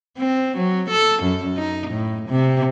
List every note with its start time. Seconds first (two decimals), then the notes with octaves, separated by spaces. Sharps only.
0.18 C4
0.58 F#3
0.90 A4
1.23 F#2
1.58 D#4
1.91 A2
2.29 C3